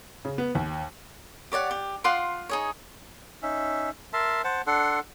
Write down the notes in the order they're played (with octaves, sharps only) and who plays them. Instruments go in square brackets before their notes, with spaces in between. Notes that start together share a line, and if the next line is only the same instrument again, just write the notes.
[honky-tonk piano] C#3
B3
D#2
[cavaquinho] G4 C#5 D5 F#5
G4
F4 F#5 C6 D6
D#4 G#4 C#5
[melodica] C#4 D#4 E5
A#4 E5 A5 C6
C5 F#5 A5
D4 A4 F#5 C6